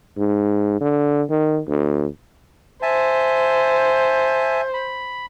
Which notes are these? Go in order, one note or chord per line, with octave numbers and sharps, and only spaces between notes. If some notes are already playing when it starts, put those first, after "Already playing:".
G#2
D3
D#3
D2
C5 E5 G#5 A5
B5